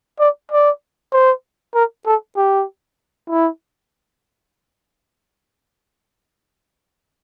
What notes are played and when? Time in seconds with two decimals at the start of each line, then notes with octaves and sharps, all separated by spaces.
0.19 D5
0.51 D5
1.12 C5
1.74 A#4
2.06 A4
2.36 G4
3.29 E4